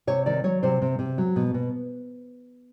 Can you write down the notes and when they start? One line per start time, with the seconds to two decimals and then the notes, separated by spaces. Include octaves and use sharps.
0.07 C3 C#5
0.26 D#3 D5
0.44 F#3 C#5
0.63 C3 C5
0.82 C3
0.99 C3
1.18 F#3
1.36 B2
1.54 B2